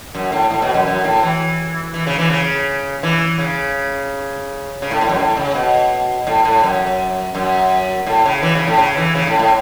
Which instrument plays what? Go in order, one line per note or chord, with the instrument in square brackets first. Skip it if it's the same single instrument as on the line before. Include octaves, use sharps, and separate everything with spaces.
[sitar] F#2
A2
A2
B2
F#2
F#2
A2
E3
E3
C#3
E3
C#3
E3
C#3
C#3
A2
A2
F#2
A2
C#3
B2
A2
A2
F#2
F#2
A2
C#3
E3
C#3
A2
C#3
E3
C#3
A2
A2